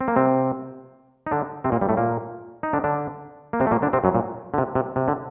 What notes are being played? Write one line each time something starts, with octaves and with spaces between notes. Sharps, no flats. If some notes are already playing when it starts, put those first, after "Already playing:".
C4
A#3
C3 C4
D#4
D3 D4
C3 C4
A#2 A#3
G2 G3
A2 A3
A#2 A#3
D#4
D3 D4
D3 D4
A#3
C3 C4
A3
A#2 A#3
D3 D4
C3 C4
F#2 F#3
A#2
D3
C3
C3
C3
D3